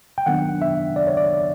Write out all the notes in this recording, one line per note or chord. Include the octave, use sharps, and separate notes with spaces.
G5
D#3 F#3 B3 D4 F#5
E5
D5
C#5
D5